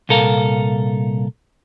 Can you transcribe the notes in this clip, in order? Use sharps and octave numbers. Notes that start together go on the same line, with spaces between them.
C2 A#2 A4 A#4 F5